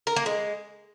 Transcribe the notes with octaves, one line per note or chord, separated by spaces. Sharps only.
A#4
A#3
G#3